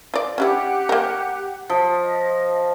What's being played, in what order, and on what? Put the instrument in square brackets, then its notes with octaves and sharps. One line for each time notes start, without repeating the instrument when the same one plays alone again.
[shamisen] F4 D5
[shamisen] C#4 D4 E4 [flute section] G4 F#5 F#6
[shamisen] A#3 A#4
[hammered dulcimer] F3
[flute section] D#5